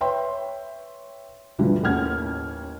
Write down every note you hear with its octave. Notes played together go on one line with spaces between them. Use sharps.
B4 C#5 E5 G5 C6
D2 G2 D3 E3 F3 G3
A1 D#2 C#4 F#5 F6 G#6